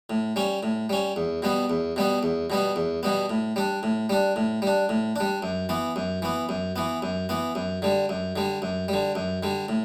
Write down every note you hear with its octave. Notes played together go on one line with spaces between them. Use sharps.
A2
G3 C#4
A2
G3 C#4
E2
B2 G3 B3
E2
B2 G3 B3
E2
B2 G3 B3
E2
B2 G3 B3
A2
G3 D4
A2
G3 D4
A2
G3 D4
A2
G3 D4
F#2
E3 B3
F#2
E3 B3
F#2
E3 B3
F#2
E3 B3
F#2
D3 G3
F#2
D3 G3
F#2
D3 G3
F#2
D3 G3
A2